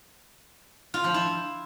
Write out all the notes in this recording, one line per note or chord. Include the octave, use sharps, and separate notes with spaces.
F4
F3
E4